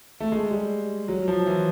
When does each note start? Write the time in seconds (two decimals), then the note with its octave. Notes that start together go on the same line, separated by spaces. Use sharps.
0.20 A3
0.32 G#3
0.51 G3
1.08 F#3
1.28 F3
1.47 E3